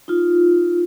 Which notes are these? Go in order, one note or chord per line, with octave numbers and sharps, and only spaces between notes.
D#4 F4